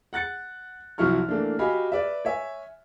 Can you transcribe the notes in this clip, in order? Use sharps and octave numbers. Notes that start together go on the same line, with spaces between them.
F#5 F#6 A6 C#7
C2 F3 F#3 E4 C#6 F6
E3 A3 A#3 D4
F#4 G4 D#5 F5 G#5 B5
B4 D5 E5
C#5 E5 G#5